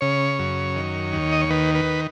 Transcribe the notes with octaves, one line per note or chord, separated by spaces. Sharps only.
C#3 C#5
F#2
D#3
D#2
D#5
C#5
D#3 B4
B4